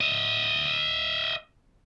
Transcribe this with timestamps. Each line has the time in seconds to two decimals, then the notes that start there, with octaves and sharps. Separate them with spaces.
0.01 D#5 E5